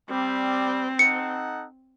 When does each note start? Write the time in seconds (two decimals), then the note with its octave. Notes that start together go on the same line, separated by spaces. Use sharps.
0.10 G3 C4
0.99 D#4 A4 F#5 C#7